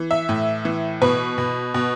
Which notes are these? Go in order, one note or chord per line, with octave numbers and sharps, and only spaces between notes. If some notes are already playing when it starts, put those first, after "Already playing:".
Already playing: E3
E5
A2
E3
B2 B4
B2
B2